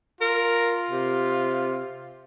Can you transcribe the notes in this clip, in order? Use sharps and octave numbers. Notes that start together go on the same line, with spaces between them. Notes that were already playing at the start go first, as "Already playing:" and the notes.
F4 A#4
C3